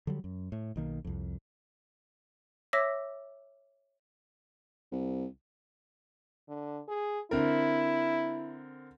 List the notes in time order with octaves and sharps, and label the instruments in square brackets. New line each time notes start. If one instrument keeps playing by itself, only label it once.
[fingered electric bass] D3 F#3 G3
F#2
A2
B1 D#3 A#3
C2 F2
[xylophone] C#5 E5 D6 E6 A#6 B6
[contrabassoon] C2
[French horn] D3
G#4
[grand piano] D3 C4 A#4 [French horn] E4